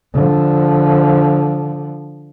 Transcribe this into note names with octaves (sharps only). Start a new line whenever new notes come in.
D3 F3